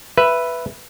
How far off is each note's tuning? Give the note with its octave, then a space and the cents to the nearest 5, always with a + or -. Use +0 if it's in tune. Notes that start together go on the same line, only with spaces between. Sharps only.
B4 +0 E5 +15